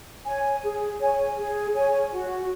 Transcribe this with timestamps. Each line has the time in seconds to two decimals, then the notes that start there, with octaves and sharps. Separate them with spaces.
0.25 C#5 G#5
0.63 G#4
0.99 C#5 G#5
1.37 G#4
1.74 C#5 G#5
2.12 F#4